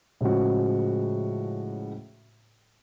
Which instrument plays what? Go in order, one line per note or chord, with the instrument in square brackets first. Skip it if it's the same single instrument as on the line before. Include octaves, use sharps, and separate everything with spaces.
[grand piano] A2 C#3 F3 G#3 F#4